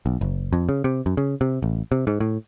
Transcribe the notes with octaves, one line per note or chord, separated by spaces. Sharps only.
B1
F#1
F2
C#3
C3
F#2
C#3
C3
A1
C3
G#2
A2